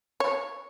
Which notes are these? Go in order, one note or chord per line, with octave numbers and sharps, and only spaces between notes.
C#5